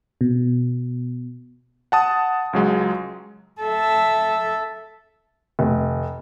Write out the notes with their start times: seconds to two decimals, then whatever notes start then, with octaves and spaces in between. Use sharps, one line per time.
0.21 B2
1.92 F#5 A5 D#6
2.53 C#2 F#3 G#3
3.61 A4 E5
5.59 F1